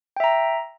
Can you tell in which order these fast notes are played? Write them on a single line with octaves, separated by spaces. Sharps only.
G5 E5 A#5